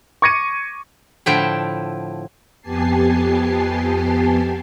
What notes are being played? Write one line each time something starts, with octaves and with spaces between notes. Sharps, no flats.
C#6 D6 G#6 A#6 C#7 D#7
A2 D3 F3 E4 G5 A5
F2 B3 G4 G#5 A5 C7